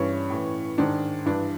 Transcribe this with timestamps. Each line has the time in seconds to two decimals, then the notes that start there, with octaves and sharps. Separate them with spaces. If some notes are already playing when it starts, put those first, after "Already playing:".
Already playing: G2 E3 C#4
0.30 A2 E3
0.78 G#2 D#3 D4
1.26 G2 E3 D4